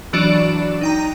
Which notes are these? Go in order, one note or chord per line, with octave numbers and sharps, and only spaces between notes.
E3 F#3 D4 F#4 D5 E7
D#4 G5 A#5